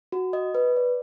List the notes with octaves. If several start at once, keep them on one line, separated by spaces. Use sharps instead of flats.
F#4
D#5
B4
D5